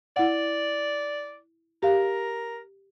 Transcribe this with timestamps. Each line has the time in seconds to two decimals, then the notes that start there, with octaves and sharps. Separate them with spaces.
0.17 E4 D5 F#5
1.83 G4 A#4 F5